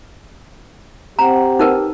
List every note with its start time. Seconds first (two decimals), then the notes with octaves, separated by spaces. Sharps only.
1.19 C4 G4 C5 F#5 A#5
1.59 D#4 A#4 B4